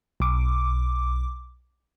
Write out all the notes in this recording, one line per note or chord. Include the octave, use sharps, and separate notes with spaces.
B1 D6